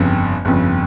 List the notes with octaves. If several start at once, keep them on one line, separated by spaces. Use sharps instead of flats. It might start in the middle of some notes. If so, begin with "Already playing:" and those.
Already playing: G1 F2 C#3
G1 F2 C#3